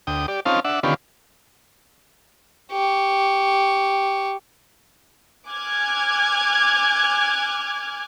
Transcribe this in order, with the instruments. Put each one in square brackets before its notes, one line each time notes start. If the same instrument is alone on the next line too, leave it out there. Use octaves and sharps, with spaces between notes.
[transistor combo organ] D2 G5 D#6
G4 D5
C4 C#4 D#4 F4 F5 A5
D4 E5 F#5
D3 D#3 B3 C#4 F4 G4
[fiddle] G4 C#6
[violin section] G#5 D6 F6 F#6 G#6